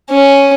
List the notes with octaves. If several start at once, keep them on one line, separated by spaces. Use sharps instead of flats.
C#4